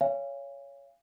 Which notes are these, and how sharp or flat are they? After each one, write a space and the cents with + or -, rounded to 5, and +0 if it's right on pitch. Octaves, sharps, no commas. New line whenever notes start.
C#5 +15 F5 -30 G#5 -25